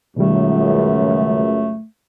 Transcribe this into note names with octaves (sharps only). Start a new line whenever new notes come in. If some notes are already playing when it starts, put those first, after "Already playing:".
C#2 F#2 B2 D#3 G3 A3